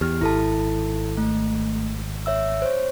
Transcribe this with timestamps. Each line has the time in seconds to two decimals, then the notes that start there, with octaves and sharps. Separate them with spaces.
0.01 E2 G4 F6
0.21 G#1 E4 A4 A5
1.17 A3
2.26 C#5 E5 E6
2.62 C5 C#5